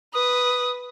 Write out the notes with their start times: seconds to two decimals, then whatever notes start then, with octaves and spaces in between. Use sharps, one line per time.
0.14 B4 D#6